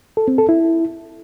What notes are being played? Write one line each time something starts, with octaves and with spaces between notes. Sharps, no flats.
A4
C4
A4
E4